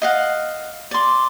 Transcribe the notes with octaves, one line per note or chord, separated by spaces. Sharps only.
D#5 F5 F#5
D5 C6